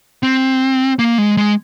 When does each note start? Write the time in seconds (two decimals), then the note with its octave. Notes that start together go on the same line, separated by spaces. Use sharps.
0.23 C4
0.99 A#3
1.18 G#3
1.37 G#3